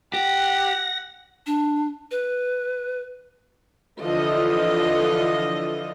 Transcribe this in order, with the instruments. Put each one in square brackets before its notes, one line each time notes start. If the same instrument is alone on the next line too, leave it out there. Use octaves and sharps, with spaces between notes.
[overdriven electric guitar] G4 [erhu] F#5 [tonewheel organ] A#6
[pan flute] D4
B4
[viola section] D3 E3 F3 F4 A4 D#5